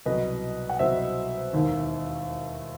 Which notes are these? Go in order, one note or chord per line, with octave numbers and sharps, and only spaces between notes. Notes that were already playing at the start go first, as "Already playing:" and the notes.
C2 B2 F#3 B4 D#5
F#5
C2 B2 F#3 C5 E5
E1 D#2 D#3